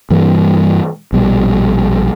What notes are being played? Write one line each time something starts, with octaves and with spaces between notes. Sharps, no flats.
G2 E3 G3 A#3
A#1 B2 G3